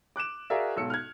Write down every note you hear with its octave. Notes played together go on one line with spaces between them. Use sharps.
D6 F#6 D7 E7
F#4 G#4 A#4 D5 E5 F5
B1 G#2 E6 C#7
F6 F#6 G#6